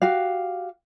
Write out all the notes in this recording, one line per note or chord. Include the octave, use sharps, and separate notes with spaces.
F#4 G4 F5